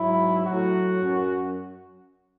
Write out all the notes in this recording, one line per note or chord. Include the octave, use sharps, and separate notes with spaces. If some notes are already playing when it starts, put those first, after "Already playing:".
Already playing: G#2 F#3 E4
A2 F#3 F#4
F#2